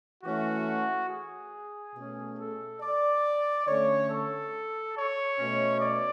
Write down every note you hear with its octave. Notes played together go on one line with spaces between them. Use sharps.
E3 A3 C#4 F#4
G#4
B2 A3 C#4
A4
D5
D3 A3 C#4 C#5
A4
C#5
B2 A3 C#4
D5